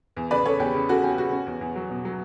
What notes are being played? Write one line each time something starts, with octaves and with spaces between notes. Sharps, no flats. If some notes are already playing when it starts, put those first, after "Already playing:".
E2
C#3 B4 D5
C#3 A4 C#5
E2 G4
C#3
C#4 F#4 A4
C#4 G4
C#3 F#4
C#4
E2
E2
F#3
B2
F#3